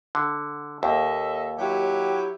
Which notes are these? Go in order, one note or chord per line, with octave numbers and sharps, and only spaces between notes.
D3
D#2 A4 D#5 E5
F#3 E4 G4